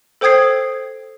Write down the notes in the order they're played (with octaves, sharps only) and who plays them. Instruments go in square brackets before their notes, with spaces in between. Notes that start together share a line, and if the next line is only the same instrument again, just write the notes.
[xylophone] A4 C5 G5 D#6 G#6 C7